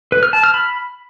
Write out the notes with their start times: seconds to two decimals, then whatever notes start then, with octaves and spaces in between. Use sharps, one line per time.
0.12 B4
0.23 F6
0.33 A5
0.44 F6
0.54 B5